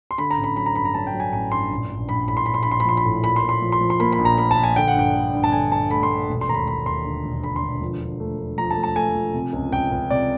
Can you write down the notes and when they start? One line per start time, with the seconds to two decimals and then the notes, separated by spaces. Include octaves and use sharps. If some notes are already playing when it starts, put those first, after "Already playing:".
0.11 C6
0.18 D3 B5
0.31 A#5
0.37 A1
0.44 B5
0.56 F#3 B5
0.66 A#5
0.75 G2 B5
0.85 A#5
0.94 F#3 A5
1.07 G5
1.14 F#3
1.20 G#5
1.32 A1 G#5
1.52 G2 C6
1.70 A#1
1.90 A#1
2.09 A#1 B5
2.28 A2 B5
2.37 C6
2.46 A#1 B5
2.54 C6
2.63 A#1 B5
2.71 C6
2.80 B5
2.85 F3 C6
2.97 B5
3.05 A2
3.23 A#2 B5
3.36 C6
3.42 A#2
3.49 C6
3.62 F3
3.72 C6
3.81 F3
3.90 C6
4.00 A#3 B5
4.12 B5
4.19 A#1
4.25 A#5
4.38 A#3 B5
4.51 A5
4.57 A#1
4.64 G#5
4.76 D3 G5
4.88 F#5
4.95 G2 G5
5.14 D3
5.34 G2
5.44 A5
5.52 D3 G#5
5.71 G2 A5
5.91 A3 B5
6.03 C6
6.10 A3
6.29 E1
6.41 C6
6.48 D#2 A#5
6.54 B5
6.67 E1 B5
6.86 D#2 C6
7.05 D3
7.24 E1
7.43 D3 B5
7.56 C6
7.62 E1
7.81 F3
8.01 F3
8.20 A3
8.39 A3
8.58 F3 A#5
8.71 A5
8.77 A3
8.84 A5
8.96 A3 G#5
9.15 F3
9.34 C3
9.53 C#2
9.72 C#2 G5
9.92 C#2
10.10 C3 D5